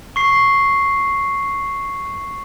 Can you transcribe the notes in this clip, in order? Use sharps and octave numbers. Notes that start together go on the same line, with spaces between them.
C#6 C7